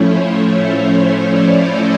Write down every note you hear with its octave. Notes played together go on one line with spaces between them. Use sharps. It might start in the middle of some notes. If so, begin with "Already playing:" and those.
Already playing: A2 F3 A3 C#4 E4 C5 C#5
C5
C#5
D5
D#5